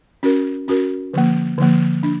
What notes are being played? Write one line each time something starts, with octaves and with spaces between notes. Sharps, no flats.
C#4 F#4 A#4
C#4 F#4 A#4
D3 F3 A#3
D3 F3 A#3
D4